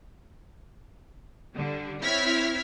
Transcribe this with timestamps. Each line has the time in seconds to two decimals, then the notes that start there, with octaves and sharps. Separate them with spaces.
1.54 D3 G3
2.02 C4 E4 C#5 F6 G#6 B6